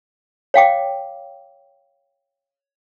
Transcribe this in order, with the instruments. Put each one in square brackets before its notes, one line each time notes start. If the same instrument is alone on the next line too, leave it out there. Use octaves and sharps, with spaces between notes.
[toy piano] C#5 F5 G5 D6